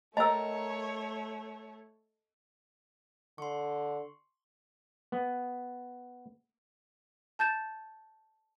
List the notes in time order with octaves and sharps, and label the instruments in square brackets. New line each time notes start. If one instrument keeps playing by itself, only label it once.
[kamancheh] A3 C#5 [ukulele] A#4 G5 A#5 [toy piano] D#5 E6
[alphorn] D3 [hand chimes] C6 C#6
[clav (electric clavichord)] B3
[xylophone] A5 G6 A6 E7